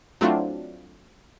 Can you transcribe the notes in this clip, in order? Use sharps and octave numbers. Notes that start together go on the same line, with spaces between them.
F#3 A3 C4 D4 E4 F4